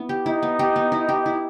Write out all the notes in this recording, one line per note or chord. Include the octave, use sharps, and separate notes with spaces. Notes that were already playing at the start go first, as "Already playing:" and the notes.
Already playing: B3 E4
G4
D#4 E4
B3
G4
B3
E4
G4
E4